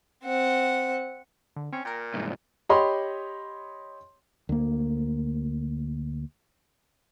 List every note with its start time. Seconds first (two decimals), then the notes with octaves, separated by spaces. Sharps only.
0.24 C4 F#5
1.56 D3
1.73 C4 C#4
1.85 A#2 A#4 G5
2.14 C2 G#2
2.69 G4 C#5 D#5 B5 C6
4.49 D2 A#3